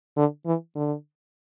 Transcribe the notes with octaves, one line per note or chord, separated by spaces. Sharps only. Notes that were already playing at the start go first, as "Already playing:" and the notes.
D3
E3
D3